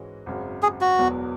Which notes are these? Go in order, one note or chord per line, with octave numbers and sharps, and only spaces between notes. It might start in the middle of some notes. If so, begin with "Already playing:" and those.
Already playing: G#2 E3 G#3 C#4 F#4
G#1 F#2 C#3
G#4
F#4
E1 E2 B2 F#3 B3